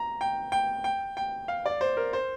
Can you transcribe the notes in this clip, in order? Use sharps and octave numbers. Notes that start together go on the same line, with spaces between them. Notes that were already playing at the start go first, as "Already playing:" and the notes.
Already playing: A#5
G5
G5
G5
G5
F5
D5
C5
A#4
C5